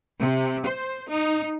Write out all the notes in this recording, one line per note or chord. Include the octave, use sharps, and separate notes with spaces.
C3
C5
D#4